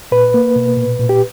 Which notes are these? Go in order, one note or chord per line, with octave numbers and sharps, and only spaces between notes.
A#2 B4
A#3
B2
A#2
A#2
G4